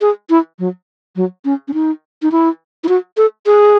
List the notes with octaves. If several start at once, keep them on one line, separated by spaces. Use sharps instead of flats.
G#4
E4
F#3
F#3
C#4
C#4
D#4
D#4
E4
E4
F#4
A4
G#4